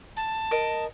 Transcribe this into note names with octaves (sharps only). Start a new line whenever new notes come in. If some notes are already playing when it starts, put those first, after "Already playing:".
A5
A#4 D#5